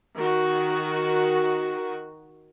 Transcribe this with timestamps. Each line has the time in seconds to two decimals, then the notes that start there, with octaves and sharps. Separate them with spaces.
0.16 D#3 F#4